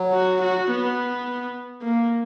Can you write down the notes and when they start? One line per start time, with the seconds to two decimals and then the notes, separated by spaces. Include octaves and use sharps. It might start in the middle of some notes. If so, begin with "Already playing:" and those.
Already playing: F#3
0.13 F#4
0.41 F#4
0.70 B3
1.82 A#3